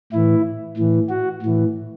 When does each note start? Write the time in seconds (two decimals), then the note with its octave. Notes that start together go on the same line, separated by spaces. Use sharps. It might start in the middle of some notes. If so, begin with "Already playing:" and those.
0.13 A2 E3 E4
0.77 A2 E3
1.09 F#4
1.42 A2 E3